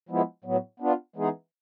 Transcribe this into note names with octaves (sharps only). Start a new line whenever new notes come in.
F3 G#3 B3 E4
A2 F#3 B3
B3 D4 F4
E3 G#3 B3 D#4 G#4